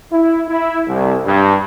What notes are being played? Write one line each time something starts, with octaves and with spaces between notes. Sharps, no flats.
E4
E4
C2
G2